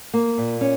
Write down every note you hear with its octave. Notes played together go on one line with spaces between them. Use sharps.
A#3
A#2
C#4